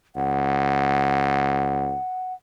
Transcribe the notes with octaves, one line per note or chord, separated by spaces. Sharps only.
C#2 F#5